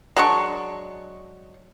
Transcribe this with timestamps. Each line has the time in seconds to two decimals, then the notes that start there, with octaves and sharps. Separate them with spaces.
0.16 F#3 G#3 D4 C#6